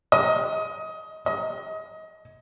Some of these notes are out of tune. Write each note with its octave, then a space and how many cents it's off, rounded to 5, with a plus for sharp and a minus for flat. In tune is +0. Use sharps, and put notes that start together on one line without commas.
D#5 +20
D#5 +25